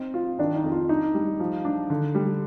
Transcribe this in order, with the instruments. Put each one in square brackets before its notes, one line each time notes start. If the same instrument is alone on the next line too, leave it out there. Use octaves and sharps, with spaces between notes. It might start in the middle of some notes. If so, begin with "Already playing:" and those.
Already playing: [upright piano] C4 D#4
F4
[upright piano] D#3 [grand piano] D4
[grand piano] D#4
[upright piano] F2
[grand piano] F4
[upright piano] D4 [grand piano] D#4
[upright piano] G3
F3
D4
D3
G3